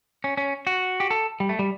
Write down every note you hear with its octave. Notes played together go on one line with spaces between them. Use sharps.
C#4
C#4
F#4
G4
A4
G3
A3
G3